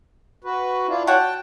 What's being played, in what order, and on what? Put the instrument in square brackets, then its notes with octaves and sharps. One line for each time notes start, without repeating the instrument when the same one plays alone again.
[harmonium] F#4 B4
D4 E4 F4
[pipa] F#4 C#5 F#5 [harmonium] G5 A5